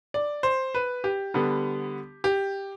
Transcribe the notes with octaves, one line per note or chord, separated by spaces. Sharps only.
D5
C5
B4
G4
D3 G3 B3
G4